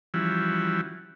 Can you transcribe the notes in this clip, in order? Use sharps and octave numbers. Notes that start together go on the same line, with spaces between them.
E3 F3 G3 C#4 E4 F#4